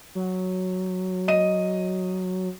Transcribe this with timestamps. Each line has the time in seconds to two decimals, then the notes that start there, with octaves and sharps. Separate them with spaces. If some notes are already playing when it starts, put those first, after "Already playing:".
0.15 F#3
1.28 D#5 D#7